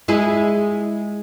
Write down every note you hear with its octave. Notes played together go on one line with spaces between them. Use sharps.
G#3 E4 G#4